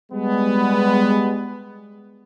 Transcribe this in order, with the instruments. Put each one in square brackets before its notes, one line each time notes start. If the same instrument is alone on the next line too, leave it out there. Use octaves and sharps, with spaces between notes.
[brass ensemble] G3 G#3 B3